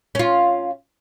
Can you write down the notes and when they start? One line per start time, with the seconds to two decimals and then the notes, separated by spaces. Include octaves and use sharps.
0.15 C#4 F4